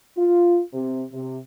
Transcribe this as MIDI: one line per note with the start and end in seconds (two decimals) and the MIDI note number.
0.17 0.60 65
0.73 1.03 48
1.12 1.38 48